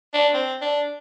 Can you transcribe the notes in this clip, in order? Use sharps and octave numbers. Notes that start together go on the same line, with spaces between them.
D4
C4
D4